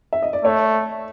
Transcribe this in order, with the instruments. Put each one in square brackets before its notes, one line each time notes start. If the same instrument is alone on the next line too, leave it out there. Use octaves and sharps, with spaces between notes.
[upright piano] E5
D#5
D5
[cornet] A3 [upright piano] C#5